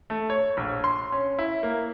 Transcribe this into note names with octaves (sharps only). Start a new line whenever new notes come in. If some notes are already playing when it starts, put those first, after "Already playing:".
A3
C#5
A#1
C6
C#4
E4
A#3